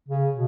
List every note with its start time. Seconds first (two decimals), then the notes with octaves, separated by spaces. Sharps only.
0.09 C#3
0.32 B2